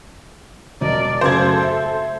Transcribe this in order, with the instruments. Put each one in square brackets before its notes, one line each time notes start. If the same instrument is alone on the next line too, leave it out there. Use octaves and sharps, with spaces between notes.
[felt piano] E1 D#5 [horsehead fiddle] A#4 D5
[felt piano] F#2 C#3 G#6 [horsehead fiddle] A3 A4 [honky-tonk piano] C5
[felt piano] E5